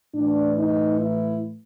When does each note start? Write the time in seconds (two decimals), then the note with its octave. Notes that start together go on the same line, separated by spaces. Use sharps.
0.13 A2 E3 D4
0.58 D#4
1.01 E4